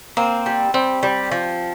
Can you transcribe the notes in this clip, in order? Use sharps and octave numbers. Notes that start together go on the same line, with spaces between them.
A#3 C4
G3
G3 C4
G3
F3